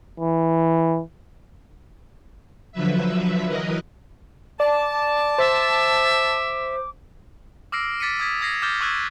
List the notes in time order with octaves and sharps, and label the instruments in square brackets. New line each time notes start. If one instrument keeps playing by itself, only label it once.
[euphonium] E3
[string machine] D3 F3 F#3 B4 E5
E3 F#3 A#4 B4 D#5
[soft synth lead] D5 [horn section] A5 [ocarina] D6
[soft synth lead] C5 [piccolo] E5
[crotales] D6 E6 F6 A#6 C7 D7
D6 A6 B6 C#7 D#7
D#6 G#6 B6
E6 G#6 A#6 C7
D6 F6 G6 A6 G7
C#6 E6 F#6 G#6